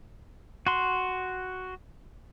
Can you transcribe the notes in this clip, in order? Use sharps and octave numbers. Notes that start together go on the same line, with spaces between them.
F#4 C6